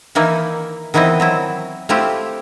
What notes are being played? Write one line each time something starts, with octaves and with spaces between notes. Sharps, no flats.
D#3 E3 A#3 D#4 E4
D#3 E3 B3 C4 E4 D#5
F#3 C4 E4
A3 C4 E4 F4 G4